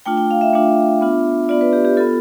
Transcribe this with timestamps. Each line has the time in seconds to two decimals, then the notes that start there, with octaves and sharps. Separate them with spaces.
0.06 A3 D4 F4 G5
0.17 G5
0.31 F5
0.41 E5
0.53 A3 D4 F4
1.01 B3 D4 F4
1.49 B3 D4 F4 D5
1.61 B4
1.73 G4
1.85 G4
1.97 B3 F4 A4